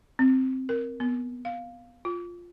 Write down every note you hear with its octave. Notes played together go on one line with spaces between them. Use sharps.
C4
A#4
B3
F5
F4